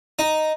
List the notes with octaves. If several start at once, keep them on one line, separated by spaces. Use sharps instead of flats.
D#4